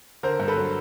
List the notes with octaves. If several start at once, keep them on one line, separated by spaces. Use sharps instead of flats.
D3 A#4 C5
G2
A4 B4
F#3